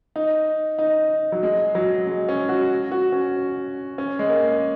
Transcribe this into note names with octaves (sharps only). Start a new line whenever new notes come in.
D#4
D#4
F#3
G#3
F#3
G#3
C#4
F#4
F#4
C#4
C#4
G#3
A#3